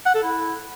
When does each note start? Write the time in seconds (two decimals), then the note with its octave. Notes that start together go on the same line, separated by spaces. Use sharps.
0.06 F#5
0.15 A4
0.24 E4